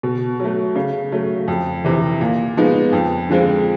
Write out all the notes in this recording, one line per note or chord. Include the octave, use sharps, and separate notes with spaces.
B2
F#3 A3
C#3
F#3 A3
F2
C3 E3
A#2
F3 G#3 B3 D#4
F2
D3 F3 G#3 C4